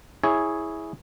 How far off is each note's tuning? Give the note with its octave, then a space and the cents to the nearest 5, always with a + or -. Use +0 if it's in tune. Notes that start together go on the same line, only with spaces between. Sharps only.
E4 -15 G#4 +0 C#5 +5